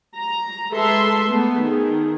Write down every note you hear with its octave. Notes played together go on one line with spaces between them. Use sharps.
A#5
G#3 G#4 A4 B4 E5 C6
A3 B3 A4
D#3 G#4